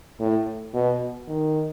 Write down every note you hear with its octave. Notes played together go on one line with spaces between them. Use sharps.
A2
B2
D#3